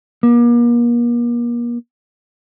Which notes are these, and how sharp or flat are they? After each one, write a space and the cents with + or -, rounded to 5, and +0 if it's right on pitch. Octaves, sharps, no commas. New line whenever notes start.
A#3 +40